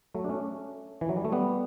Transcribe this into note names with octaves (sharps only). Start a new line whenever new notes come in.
F#3 A3
D4
A3 C#4
E3
F#3
G3
A3
G3 B3